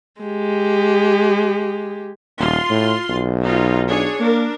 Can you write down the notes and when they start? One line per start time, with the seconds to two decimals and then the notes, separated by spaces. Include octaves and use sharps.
0.21 G#3 G4
2.40 D#1 F4 C6
2.69 A2
3.09 B1
3.43 D#4 F4
3.88 D4 G#4 C#5
4.20 A#3 D4 A#4